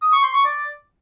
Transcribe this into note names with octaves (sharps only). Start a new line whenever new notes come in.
D#6
C#6
C6
C#6
D5